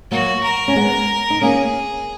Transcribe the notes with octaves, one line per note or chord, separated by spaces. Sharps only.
F#3 A#3 F#4
A#4
C#4
G#3 B3
D#4
A#3 C#4 G#4